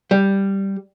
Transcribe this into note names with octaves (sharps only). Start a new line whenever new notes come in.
G3